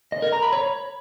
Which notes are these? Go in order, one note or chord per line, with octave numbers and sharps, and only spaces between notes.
D#5
A#4
A#5
B5
C#5